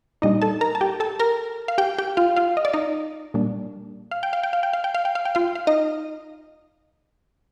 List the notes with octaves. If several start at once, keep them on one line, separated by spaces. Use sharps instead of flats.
A#2 G3 D4 D#4 D#5
A4 A5
A#4 A#5
A5
G4 G5
A4 A5
A#4 A#5
F5
G4 G5
G4 G5
F4 F5
F4 F5
D#5
D5
D#4 D#5
A#2 G3 A#3 D4
F5
G5
F5
G5
F5
G5
F5
G5
F5
G5
F5
G5
F4 F5
F5
D#4 D#5